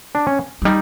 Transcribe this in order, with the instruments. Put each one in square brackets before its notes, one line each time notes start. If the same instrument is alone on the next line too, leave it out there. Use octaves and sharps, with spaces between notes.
[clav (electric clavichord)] D4
C#4
[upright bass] F#3
[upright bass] G3 [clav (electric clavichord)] D#4